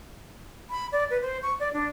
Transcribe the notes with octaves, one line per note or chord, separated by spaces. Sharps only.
B5
D5
B4
C5
C#6
D5
D4